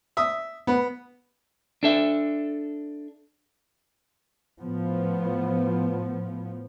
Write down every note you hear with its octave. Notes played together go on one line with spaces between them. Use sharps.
E5 D#6
B3
D4 A4 E5
A2 F3 B3